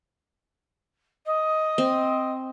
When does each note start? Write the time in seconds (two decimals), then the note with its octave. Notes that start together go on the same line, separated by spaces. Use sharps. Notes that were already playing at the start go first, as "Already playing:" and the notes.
1.26 D#5
1.78 C4